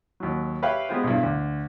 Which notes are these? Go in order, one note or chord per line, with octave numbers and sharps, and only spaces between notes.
D#2 F#3
G4 B4 C#5 E5 F5 G5
G#3 B3 F4 G4 C5
B1 E2 G2
D2